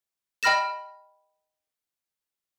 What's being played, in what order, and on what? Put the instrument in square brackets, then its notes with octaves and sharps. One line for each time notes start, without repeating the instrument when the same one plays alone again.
[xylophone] D#5 G5 B5 F6 A#6 E7